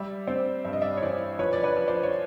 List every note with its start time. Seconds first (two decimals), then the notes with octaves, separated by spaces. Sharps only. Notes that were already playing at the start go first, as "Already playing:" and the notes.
Already playing: G3 D5 E5
0.27 C4 C5 D5
0.64 G2 E5
0.73 D#5
0.82 D5 E5
0.97 C#5
1.02 E3 C5 D5
1.38 F3 B4 C#5
1.53 D5
1.63 B4 C#5
1.76 F3
1.88 C5 D5
2.03 C#5